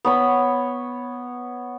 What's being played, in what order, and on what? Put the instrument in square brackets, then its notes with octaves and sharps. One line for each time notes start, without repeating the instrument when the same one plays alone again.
[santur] B3 C#5 B5